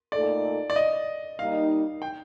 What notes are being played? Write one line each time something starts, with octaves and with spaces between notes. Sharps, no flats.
A#2 A3 D#4 A4 D5
D5
D#5
G3 A#3 D#4 F5
G5